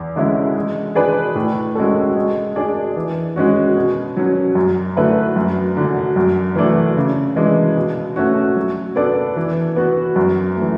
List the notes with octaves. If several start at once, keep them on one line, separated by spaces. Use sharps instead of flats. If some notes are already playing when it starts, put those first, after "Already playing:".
Already playing: E2
D3 G#3 C#4 E4
G#3
D4 G#4 B4 D5
A2
G#3 C#4 F#4 A4
G#3
D4 G#4 D5
E3
G#3 C#4 F#4
B2
F#3 C#4
F#2
D3 A3 E4 B4
F#2
D3 F#3
F#2
E3 A3 D4
C#3
E3 G#3 D4
B2
A3 C#4 F#4
F#3
B3 D4 A4 D5
E3
B3 F#4
F#2
A3
E3